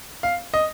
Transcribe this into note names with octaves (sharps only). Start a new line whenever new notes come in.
F5
D#5